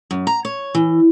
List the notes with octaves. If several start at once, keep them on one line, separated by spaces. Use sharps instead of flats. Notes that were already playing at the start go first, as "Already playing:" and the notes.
F#2
A#5
C#5
E3